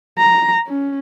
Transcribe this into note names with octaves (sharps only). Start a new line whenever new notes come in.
A#5
C#4